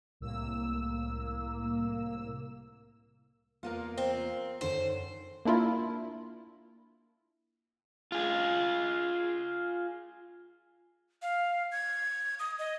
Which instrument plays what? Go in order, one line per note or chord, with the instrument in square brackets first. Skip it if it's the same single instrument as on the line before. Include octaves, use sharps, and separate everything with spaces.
[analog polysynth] C2 A2 A#3 E6
[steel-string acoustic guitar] E2 A#3 B3 [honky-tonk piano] F4 A#4
[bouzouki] C4
[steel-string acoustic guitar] F#2 D#3 [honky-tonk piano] D3 [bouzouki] C5
[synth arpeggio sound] A#3 D4 E4 F4 A#4
[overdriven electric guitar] F4 G#4
[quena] F5
G#6
D#6
D#5